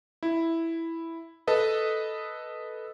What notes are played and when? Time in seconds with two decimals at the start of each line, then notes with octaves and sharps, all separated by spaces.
0.23 E4
1.47 A4 B4 D#5